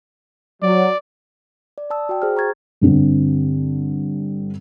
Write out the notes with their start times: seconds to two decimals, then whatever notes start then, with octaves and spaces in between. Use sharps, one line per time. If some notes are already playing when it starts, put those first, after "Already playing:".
0.62 F#3 D5
1.78 D5
1.90 D5 A5 D#6 E6
2.09 F#4 G5
2.22 G#4 C5 F6
2.36 A#5 C#6 G#6 A6
2.81 G2 D3 C4